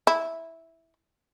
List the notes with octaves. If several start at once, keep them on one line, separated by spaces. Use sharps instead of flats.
E4